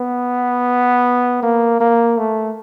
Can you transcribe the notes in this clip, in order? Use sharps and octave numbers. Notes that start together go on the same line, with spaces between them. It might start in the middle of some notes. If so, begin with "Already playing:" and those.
Already playing: B3
A#3
A#3
A3